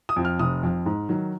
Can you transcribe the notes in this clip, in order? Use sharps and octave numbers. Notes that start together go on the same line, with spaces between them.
D#6
F2 F3
F6
F1 D#6
F2 F3
G#2
D#3 F#3